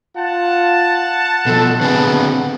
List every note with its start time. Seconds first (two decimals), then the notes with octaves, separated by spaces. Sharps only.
0.17 F4 F#5 A5
1.47 B2 F3 A4
1.81 D3 B3 C4 G#4